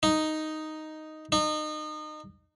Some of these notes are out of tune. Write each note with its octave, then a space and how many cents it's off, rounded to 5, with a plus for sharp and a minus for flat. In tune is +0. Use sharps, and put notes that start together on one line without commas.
D#4 +0
D#4 -30